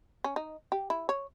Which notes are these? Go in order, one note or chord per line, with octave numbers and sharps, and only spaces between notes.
C#4
D#4
G4
E4
C#5